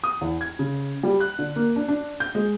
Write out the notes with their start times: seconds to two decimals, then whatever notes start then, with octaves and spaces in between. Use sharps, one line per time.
0.04 D#6
0.21 E2
0.41 G#6
0.59 C#3
1.03 G3
1.20 F#6
1.39 D3
1.56 A#3
1.76 D4
1.89 D4
2.20 G6
2.35 G#3